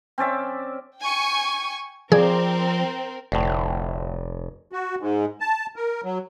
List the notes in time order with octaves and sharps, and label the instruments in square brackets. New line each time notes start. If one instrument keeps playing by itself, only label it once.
[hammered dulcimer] C4 C#4 D5 E5
[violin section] G5 G#5 C#6
[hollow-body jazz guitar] F3 D5 [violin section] C4 A#4 [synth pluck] G#4
[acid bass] F1 [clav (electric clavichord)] D2 A2
[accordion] F#4
G#2
A5
A#4
F#3